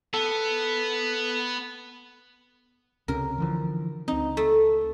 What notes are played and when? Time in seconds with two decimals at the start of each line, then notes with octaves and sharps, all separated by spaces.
0.14 B3 A4
3.08 C#2 C3 C#4 A#4
3.38 D3 E3 F3
4.08 C#2 C4 D#4
4.37 A3